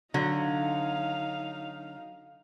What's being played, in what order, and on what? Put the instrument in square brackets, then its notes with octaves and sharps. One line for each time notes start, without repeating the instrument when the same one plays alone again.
[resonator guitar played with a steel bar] D3 F#3 [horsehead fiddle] D#4 F5